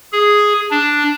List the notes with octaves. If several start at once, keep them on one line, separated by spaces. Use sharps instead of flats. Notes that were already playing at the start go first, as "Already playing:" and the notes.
G#4
D4